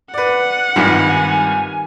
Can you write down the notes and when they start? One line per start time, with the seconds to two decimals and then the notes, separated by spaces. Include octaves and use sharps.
0.14 B4 D5 F#5
0.76 G#1 G2 D#3 G3 E4 F4 G#5